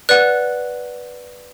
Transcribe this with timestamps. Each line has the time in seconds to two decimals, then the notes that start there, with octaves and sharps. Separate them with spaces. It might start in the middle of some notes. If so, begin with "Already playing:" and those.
0.09 B4 D5 F#5 F#6